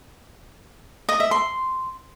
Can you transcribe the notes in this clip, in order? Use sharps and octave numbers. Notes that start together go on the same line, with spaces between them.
D#5
E5
C6